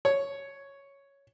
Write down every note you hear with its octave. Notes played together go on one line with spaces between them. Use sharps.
C#5